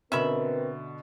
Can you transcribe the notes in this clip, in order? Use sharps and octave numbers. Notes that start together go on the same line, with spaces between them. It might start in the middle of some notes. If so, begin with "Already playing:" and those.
B2 D3 C4 C#4 A#4 B4 E5 B5